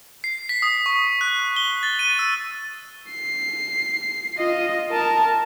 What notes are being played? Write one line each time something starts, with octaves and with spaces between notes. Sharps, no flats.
C7
B6
D#6
C#6
F#6
G7
A6
D#7
E6
C7
F4 D#5
A#4 A5